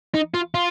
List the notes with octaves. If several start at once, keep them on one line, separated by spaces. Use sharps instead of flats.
D#4
F4
F4